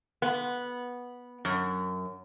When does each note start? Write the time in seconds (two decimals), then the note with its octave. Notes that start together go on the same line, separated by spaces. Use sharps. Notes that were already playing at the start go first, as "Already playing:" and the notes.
0.22 B3
1.45 F#2